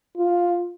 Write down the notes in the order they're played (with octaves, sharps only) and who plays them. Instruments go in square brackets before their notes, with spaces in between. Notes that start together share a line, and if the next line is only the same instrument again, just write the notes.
[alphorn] F4